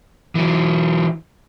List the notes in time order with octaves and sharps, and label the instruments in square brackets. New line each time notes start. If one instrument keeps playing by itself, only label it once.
[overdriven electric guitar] E3 F#3